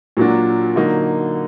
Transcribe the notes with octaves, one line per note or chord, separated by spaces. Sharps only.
A#2 F#3 A#3 D4 F#4
D3 F#3 A#3 D#4